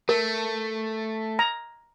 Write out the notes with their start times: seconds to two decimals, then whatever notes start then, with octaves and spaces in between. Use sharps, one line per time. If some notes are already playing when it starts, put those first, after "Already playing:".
0.09 A3 A#4
1.39 A#5